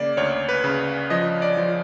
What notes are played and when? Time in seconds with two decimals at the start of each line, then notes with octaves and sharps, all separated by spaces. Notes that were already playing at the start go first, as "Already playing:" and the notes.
Already playing: C#3 A#3 D5
0.17 D2 C#5
0.49 B4
0.64 C#3
1.10 F3 D#5
1.42 D5
1.57 F3